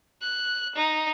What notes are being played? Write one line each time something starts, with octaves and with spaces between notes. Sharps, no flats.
F#6
D#4